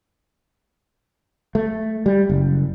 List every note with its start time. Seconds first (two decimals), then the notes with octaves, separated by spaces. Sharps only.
1.55 A3
2.06 G3
2.30 F#1